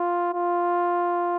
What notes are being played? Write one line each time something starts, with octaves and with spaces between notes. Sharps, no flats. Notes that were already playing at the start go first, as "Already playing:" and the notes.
Already playing: F4
F4